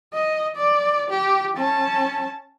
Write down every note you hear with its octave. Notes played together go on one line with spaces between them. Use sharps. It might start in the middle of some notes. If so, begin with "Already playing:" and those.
D#5
D5
G4
C#4 A5